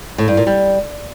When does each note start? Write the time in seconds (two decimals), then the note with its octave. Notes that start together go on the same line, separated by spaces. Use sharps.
0.18 A2
0.28 G2
0.37 A#2
0.47 G3